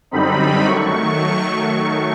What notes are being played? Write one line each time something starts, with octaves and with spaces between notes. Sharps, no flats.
F#2 D3 G3 C4 D#4 B5
D#3 F#3 A3 C#6